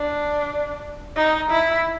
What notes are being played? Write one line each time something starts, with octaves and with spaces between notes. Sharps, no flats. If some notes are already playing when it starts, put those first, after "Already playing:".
Already playing: D4
D#4
E4